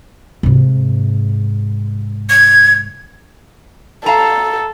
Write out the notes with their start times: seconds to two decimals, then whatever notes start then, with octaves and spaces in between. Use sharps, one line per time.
0.43 G#2 C3
2.30 G#6
4.06 A4 F5 A5 A#5